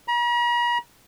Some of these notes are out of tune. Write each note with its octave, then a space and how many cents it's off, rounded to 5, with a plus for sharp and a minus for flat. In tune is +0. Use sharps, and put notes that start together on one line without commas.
A#5 +45